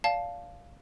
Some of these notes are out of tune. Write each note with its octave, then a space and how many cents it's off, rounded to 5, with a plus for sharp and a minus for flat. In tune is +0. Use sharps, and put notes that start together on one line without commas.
D5 -25 F5 +0 A5 -10